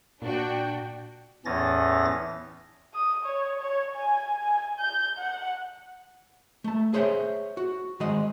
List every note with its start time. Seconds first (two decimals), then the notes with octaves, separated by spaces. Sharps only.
0.22 A#2 D4 F#4 G5
1.46 E2 A2 E3 C#4 A6 A#6
2.94 D#6
3.24 C#5
3.60 C#5
3.95 G#5
4.42 G#5
4.79 G6
5.18 F#5
6.64 A3 A5
6.94 G#4 C5 C#5 E5 F#5 G5
7.57 F#4
8.00 D#3 G#3 C5 D#5 F#5